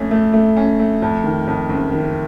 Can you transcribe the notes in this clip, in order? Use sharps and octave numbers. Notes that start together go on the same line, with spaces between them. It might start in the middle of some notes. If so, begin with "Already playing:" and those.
Already playing: F2 A3 C#4
A3
A3
C#4
A3
F2
D#3
F2
F#1
D#3